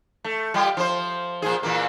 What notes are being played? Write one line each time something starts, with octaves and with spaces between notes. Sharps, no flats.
A3
G3 F4 G4
F3 C5
A#2 F3 G#4
A#2 E3 A#3